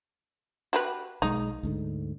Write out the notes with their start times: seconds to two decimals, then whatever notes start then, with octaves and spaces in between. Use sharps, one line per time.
0.73 F#4 G4 B4
1.22 B1 G#3 D#4
1.63 D2 G#2 D3